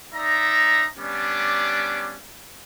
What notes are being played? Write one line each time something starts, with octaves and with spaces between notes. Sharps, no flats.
D#4 D5 E5 A#5
G3 B3 C#4 D4 D6